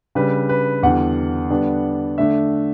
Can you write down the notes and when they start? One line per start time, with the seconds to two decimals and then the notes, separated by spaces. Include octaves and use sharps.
0.15 C#3 G3 D4 B4
0.49 B4
0.83 E2 D3 G3 B3 F#5
1.50 D3 G3 B3 D4
2.18 D3 A3 D4 E5